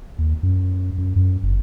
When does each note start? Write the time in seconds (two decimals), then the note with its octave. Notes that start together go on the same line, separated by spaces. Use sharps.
0.18 D#2
0.43 F#2
0.98 F#2
1.16 F#2
1.43 G1